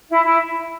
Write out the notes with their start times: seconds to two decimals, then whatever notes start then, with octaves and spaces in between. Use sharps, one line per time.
0.09 E4
0.25 E4